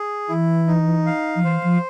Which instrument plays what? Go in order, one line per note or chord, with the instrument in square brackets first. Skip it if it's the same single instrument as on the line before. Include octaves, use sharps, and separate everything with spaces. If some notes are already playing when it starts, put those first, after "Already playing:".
Already playing: [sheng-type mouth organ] G#4
[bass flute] E3 [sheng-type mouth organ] E4
[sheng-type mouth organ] D#4
F5
[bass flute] F3
[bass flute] E3 [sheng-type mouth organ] C5
[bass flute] F3